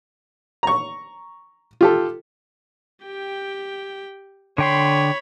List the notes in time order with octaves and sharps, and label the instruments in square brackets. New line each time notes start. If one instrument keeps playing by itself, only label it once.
[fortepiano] A#5 C#6
F4 G4 A4
[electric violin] G4 G5
[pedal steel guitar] D3 G5 C6 [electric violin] C#5 B5